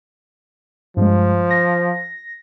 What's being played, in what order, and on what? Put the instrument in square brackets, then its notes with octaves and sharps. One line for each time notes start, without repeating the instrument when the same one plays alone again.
[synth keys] G2 G#3 [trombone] F3
[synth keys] A#6